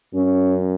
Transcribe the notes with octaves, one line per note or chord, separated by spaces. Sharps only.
F#2 C#4